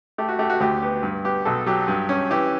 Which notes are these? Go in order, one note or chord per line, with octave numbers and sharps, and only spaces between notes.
A3 G4
F#4
A3 G4
F#4
D2 G4
B3 G4
G2
B3 G4
B1 A4
F#3 G4
G2
C#4
E3 G4